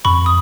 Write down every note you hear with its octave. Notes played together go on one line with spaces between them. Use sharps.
F2 B5 C#6
D#6